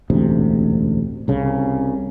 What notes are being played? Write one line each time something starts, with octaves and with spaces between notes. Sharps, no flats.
E1 A1 D2 C3
C2 C#3